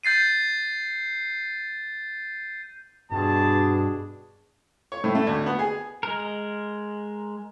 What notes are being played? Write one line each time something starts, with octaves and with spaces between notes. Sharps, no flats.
G6 A6 C7 D#7
G2 B2 D4 G#4 A5
C#5
A2
A3
D2
B3
G#4
G#3 A#4